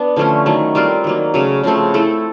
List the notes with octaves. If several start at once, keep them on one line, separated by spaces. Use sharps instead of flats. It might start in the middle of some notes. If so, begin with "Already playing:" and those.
Already playing: B3 D4
D3 F3 A3 C#4
D#3 F#3 A3
G3 C4 F4 A#4
D#3 F#3 A#3
C#3 F#3 A3 C#4
C#3 F3 A3 C4
A3 C4 E4 A4